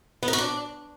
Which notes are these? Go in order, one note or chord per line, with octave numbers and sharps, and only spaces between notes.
B3
A#4
F#4
D4